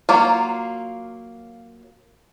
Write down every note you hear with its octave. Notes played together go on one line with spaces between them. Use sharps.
F#3 A#3 F4